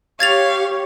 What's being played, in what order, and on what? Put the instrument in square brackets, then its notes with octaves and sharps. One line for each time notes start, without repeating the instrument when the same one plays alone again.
[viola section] G4 C#5 [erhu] F5 [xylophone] G#6 A6 F7